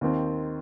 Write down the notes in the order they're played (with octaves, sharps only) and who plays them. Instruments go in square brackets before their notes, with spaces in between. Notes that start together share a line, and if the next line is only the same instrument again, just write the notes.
[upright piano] D#2 D#3 C4